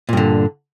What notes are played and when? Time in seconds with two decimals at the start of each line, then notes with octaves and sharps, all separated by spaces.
0.09 A#2
0.13 G2
0.17 D3